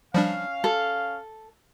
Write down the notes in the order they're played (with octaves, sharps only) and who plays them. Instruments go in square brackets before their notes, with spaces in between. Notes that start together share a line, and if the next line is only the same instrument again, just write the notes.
[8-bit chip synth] F3 G3 D4 [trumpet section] C#4 F5
[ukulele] A4